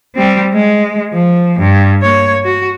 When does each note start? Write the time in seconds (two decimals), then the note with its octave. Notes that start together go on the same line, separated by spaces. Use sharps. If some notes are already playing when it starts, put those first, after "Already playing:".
0.15 G3 C4
0.54 G#3
1.14 F3
1.60 G2
2.02 A#3 C#5
2.44 F#4